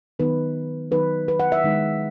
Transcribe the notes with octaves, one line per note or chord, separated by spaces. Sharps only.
D#3 F#3 B3 D#4 B4
D#3 F#3 B3 D#4 B4
B4
F#5
E5
D#3 G#3 D#4